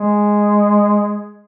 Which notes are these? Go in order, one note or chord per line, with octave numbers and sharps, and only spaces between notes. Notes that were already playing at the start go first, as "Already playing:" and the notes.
Already playing: G#3